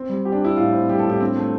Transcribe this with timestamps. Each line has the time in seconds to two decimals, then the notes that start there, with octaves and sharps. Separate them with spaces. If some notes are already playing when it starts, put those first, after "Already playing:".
Already playing: C4
0.09 G3
0.25 G4
0.32 D4
0.41 E4 G4
0.56 A2 F4
0.73 C4
0.89 G3 G4
0.99 A4
1.04 A2
1.10 G4
1.20 C4 D4
1.36 A3 F4